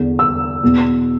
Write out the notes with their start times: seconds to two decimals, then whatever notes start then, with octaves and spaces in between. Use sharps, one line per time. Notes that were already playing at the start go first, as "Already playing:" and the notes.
Already playing: E2 D3
0.19 E6
0.63 E2 B2